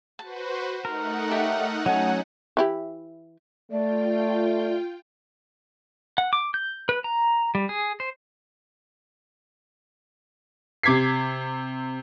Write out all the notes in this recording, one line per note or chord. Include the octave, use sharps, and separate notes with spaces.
F#4 B4 C5 A5
A3 D#4 A#4 F#5
G4 C#5 E5
F#3 C#4 F#4 G#5
E3 E4 G4
A3 F4 D5 G5
F#5
D6
G6
B4
A#5
G3
G#4
C5
C3 D6 G#6 B6 C7